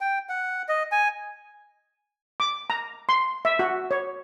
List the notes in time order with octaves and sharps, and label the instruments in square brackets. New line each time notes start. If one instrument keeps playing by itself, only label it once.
[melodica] G5
F#5
D#5
G#5
[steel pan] D6
A#5
C6
E5
F#4
C#5